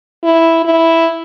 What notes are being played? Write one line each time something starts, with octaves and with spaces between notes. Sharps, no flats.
E4
E4